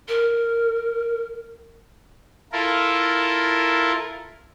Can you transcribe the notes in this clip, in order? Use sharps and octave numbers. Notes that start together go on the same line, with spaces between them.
A#4
E4 F4 A4 A#4